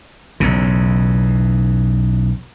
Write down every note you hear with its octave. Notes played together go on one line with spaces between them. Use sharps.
B1 E2 C#3